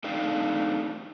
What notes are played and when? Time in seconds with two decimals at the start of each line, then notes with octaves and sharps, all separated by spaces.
0.04 A3 C4 D4 D#4 F5 G5